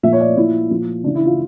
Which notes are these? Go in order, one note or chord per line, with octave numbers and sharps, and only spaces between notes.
A#2 F3 E5
C#5
D5
A#2 F3 E4
A#2 F3
C#3 E3 D4
E4
F4